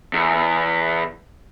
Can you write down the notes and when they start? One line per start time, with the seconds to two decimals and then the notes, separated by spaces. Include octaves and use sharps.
0.13 E2